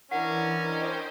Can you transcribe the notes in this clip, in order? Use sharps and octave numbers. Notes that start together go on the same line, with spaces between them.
E3 C#4 D4 E4 A#4 F#5
C5 D#5 G5